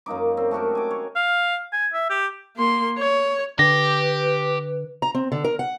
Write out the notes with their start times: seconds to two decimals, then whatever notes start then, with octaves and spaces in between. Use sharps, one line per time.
0.06 F#2 A#3 D#4 D6
0.37 C4
0.51 A3 F#4 G4 A#4
0.75 G#5 D6
0.91 C#5
1.16 F5
1.73 G#5
1.93 E5
2.10 G4
2.57 A#3 C6
2.98 C#5
3.59 D3 G4 B4 A#6
5.02 A#5
5.15 C4
5.32 D3
5.44 A#4
5.59 F#5